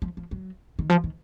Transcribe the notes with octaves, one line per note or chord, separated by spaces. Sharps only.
F3
F3
F#3
D#3
F3
D#3